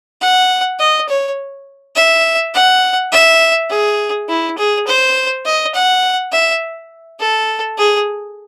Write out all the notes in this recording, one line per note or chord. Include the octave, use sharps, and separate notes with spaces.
F#5
D#5
C#5
E5
F#5
E5
G#4
E4
G#4
C5
D#5
F#5
E5
A4
G#4